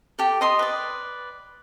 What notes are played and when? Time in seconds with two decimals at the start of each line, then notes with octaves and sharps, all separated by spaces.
0.19 G4 A4
0.41 D#5 C6 D#6
0.59 B4 D5